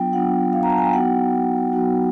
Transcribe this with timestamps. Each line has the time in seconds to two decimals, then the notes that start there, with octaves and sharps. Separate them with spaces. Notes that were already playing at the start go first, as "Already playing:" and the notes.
Already playing: F#3 B3 D4 F4 G5
0.13 F#3 B3 D4 F4 F#5
0.53 F5
0.63 A#5
0.70 A5
0.78 G#5
0.85 G5
0.93 F#3 B3 D#4 F#4 F#5
1.73 F#3 B3 D#4 F#4